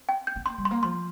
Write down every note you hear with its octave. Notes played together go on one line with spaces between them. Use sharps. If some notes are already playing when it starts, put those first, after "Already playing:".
Already playing: C4
G5
G6
C4
A#3 C6
G3
C6
A#3
F3 C6